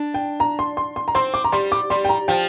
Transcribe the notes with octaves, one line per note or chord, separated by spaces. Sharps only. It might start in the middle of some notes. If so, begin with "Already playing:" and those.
Already playing: D4
G5
A#5
C6
C6
C6
A#5
C4 C6
D6
A#5
G3 C6
D6
G3 C6
G5
A#5
F3 G5